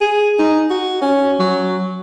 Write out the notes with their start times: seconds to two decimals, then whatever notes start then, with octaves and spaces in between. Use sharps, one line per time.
0.01 G#4
0.39 D#4
0.70 F#4
1.02 C#4
1.40 F#3